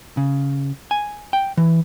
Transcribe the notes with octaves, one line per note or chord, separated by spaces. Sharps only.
C#3
G#5
G5
E3